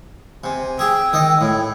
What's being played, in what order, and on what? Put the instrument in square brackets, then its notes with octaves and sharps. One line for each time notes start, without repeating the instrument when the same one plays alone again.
[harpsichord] C3 [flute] G#5
[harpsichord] G#4 [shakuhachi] G5 [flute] E6
[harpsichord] D#3 D#5
[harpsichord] A2 [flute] C#5